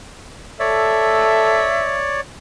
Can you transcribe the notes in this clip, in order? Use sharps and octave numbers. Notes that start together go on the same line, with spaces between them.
A4 C#5 D5 E5